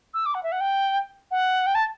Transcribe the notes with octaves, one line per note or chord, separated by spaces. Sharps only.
E6
D6
F#5
E5
F#5
G5
F#5
G5
A5